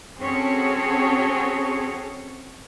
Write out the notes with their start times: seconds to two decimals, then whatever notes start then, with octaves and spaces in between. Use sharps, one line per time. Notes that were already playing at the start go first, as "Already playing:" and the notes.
0.19 C4 C#4 F#4 G#4 A4 C#5